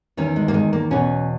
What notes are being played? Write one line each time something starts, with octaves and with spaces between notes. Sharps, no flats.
E2 D#3 C#4
G#3
A#3
G#3
A#3
E2 B2 C#4